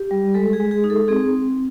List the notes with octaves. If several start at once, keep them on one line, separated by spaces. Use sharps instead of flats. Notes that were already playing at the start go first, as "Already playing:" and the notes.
Already playing: G4
G3
G#3 A4
G#4
G#3
G#4
D#4
A4
C4 G#4